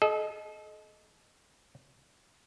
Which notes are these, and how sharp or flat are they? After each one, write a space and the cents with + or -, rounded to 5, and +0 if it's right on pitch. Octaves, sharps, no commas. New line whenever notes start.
A4 -40 D#5 +0